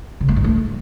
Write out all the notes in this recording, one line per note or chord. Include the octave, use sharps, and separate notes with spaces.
C#3
A3
G2
A3